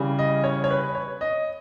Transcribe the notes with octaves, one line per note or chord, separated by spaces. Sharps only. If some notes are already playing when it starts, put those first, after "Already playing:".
Already playing: C#3 E3 G3
D#5
C#5
C#5
B4
C#5
D#5